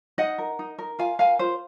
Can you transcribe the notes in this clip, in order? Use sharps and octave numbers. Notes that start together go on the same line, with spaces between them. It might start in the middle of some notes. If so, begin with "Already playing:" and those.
D#4 D#5 F#5
A#4
D#4
A#4
F4 F5 G#5
A#4 F5 G#5
F4 C5